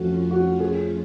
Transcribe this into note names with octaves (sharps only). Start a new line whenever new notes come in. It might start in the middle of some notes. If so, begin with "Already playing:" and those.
Already playing: F2 F3 A3 C#4 F4 F#4 A4
F#4
G#4